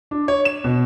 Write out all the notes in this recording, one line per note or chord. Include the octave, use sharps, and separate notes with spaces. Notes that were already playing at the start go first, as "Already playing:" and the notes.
D4
C#5
E7
B2